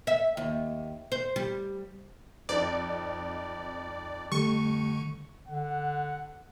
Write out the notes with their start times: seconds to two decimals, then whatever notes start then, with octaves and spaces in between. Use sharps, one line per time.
0.07 E5
0.37 D#2
1.12 C5
1.36 G3
2.49 F2 C4 D#4 D5
4.32 D3 G3 A3 C#6
5.48 D3 F#5